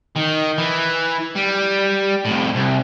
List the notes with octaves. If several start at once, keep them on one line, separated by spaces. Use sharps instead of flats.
D#3
E3
G3
F2 A2
C2